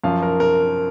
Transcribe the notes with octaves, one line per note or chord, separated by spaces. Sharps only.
F#2 F3 F5
A#4
A#4